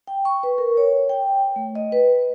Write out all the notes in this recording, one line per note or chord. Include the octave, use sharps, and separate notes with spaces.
G5
C#6
B4
A#4
C#5
G5
A3
D#5
B4